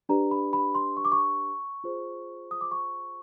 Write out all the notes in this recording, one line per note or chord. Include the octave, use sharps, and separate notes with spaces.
D4 G4 B4 D5 A#5
B5
B5
C6
C#6
D6
C#6
F4 G#4 C5
D#6
D6
C#6